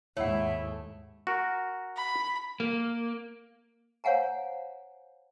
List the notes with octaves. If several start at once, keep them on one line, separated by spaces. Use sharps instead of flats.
D#2 G#2 A3 E4 C#5 F#5
F#4 A#4
B5
A#3
C5 C#5 F5 F#5 G#5 A#5